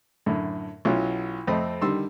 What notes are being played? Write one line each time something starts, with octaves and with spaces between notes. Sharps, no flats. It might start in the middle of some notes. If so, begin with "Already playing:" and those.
F#2 A2 D3
B1 F#3 C#4 E4 F4
F2 A3 C4 D#5 B5
D3 D#3 G3 C6 E6